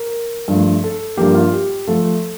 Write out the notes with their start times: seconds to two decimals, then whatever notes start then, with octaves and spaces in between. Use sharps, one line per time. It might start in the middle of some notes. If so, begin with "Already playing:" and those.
Already playing: A#4
0.48 G2 F3 A3
0.84 A4
1.17 G2 F3 A#3 G4
1.35 F4
1.53 G4
1.87 F3 A3 A4